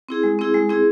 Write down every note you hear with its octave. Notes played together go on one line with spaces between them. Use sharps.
C4 E4 G#4
G#3
C4 E4 G#4
G#3
C4 E4 G#4